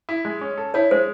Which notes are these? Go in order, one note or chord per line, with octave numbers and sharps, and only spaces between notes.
E4
G#3
C#4
A4
E4 C#5
G#3 C5